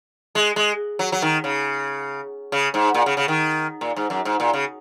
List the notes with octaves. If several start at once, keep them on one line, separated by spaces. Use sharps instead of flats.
G#3
G#3
F#3
F#3
D#3
C#3
C#3
G#2
A#2
C#3
C#3
D#3
A#2
G#2
F#2
G#2
A#2
C#3